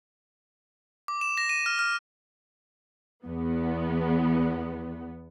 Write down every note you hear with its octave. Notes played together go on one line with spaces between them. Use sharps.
D6
E7
A#6
D#7
F6
F6
E2 B3